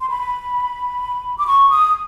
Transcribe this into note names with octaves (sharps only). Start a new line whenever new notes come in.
C6
B5
D6
C#6
D#6